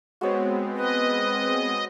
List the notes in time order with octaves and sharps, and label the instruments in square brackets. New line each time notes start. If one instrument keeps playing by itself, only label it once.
[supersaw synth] G#3 B3 C4 [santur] F#4 C#5
[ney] B4 [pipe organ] D#5